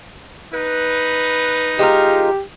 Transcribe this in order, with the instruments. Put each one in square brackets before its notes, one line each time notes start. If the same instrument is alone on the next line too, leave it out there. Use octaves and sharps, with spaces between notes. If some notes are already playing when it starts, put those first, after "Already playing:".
[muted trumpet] D#4 [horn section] B4
[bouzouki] G#3 F4 A#4 [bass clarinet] G4